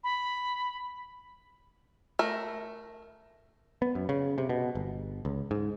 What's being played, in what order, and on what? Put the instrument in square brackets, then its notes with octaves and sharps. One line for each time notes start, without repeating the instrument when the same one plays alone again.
[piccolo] B5
[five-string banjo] A3 A#4
[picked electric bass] B3
F#2
C#3
C3
B2
G1
C#2
G#2